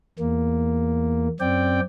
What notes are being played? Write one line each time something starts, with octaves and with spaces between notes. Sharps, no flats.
E2 A#3
F#2 C4 D5 G5